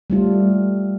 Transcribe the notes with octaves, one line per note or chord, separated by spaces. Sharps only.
G3 A3 F4